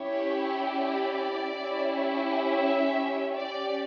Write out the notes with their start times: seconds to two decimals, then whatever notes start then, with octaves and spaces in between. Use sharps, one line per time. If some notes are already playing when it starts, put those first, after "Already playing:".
Already playing: C#4 E4 G4 C#5
0.69 D5
1.57 C#4 E4 G4
2.46 E5
3.35 C#4 G4 D5